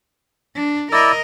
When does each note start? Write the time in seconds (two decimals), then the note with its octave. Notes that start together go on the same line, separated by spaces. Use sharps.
0.55 D4
0.92 E4 A#4 D5 D#5 E6